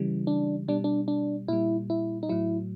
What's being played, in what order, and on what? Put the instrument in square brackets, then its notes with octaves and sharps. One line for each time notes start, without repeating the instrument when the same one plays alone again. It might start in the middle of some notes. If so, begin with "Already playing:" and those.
Already playing: [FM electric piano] C#3 E3 G3
D4
B2 G3 D4
D4
D4
A#2 G3 E4
E4
D#4
A2 F#3 E4